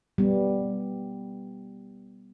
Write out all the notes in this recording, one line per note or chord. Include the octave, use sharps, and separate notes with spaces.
G3 B3